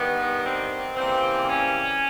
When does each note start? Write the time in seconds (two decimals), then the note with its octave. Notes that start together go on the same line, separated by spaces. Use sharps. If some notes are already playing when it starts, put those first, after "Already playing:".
Already playing: G2 D#3 G3 B3
0.44 C4
0.96 C#3 E3 G3 A#3 C4
1.48 C#4